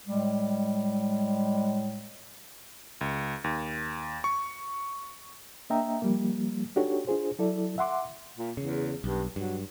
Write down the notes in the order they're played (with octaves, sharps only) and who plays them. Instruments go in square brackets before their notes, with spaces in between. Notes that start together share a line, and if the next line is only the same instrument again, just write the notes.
[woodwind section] A2 G3 G#3
[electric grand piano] C#2
D#2
C#6
[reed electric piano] A#3 D4 D#5 E5 G5 A#5
F3 G3 A#3
D4 D#4 F#4 G4 A4 C#5
D4 F4 G#4 C5
F#3 E4 A4 D5
E5 F#5 C6 D6
[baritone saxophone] A#2
[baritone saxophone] E2 [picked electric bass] C#3
[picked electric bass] B1 [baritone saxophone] G2
[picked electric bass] G2 [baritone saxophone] F#3